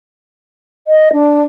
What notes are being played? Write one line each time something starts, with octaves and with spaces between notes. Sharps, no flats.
D#5
D4